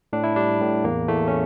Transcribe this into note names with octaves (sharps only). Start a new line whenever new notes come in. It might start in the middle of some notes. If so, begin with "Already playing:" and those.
A2 D4
E4
G3 D4
A2
E2 A#3
E2 A3
C#4